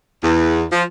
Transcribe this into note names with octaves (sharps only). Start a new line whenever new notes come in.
E2
F3